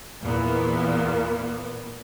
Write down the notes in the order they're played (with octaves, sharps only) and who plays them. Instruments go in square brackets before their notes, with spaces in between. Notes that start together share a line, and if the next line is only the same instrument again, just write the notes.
[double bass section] E2 E3 [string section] A#2 A#3 B3